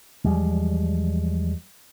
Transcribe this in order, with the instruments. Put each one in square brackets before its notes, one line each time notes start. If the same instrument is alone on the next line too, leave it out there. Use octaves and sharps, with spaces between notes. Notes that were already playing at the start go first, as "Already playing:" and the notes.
[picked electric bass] E2 F3 G3 G#3